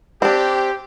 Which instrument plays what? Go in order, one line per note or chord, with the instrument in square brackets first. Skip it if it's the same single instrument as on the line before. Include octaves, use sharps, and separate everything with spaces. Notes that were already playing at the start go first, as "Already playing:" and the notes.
[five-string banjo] C4 D4 [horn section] G4